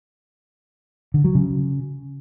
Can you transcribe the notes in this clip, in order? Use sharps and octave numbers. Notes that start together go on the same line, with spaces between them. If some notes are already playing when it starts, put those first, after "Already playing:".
D3
F#3
C#3